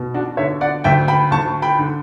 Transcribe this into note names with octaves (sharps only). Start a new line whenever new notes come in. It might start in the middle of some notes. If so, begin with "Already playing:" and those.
Already playing: B2
D4 F#4
D3 C#5 E5
D5 F#5
D2 E5 G5
G5 B5
D2 A5 C#6
G5 B5
D3